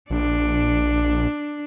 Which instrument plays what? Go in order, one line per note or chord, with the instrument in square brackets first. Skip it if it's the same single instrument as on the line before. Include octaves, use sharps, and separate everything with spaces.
[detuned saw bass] A#1 [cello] D4